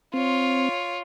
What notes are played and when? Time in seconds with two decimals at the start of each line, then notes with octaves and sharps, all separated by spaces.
0.14 C4 F4 C#5